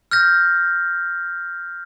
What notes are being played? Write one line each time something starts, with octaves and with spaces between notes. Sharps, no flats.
F6 G6 A#6